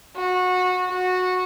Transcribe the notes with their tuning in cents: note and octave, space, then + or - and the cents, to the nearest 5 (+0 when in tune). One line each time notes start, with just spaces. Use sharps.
F#4 -20
F#4 -15